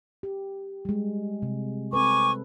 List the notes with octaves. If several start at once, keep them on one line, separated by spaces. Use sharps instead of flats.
G4
G3 G#3
C3
C4 A4 B4 G#5 C#6 D6